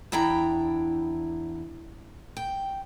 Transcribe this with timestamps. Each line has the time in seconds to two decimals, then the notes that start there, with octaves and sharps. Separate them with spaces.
0.12 E2 D4 E4 G5 A#5
2.37 G5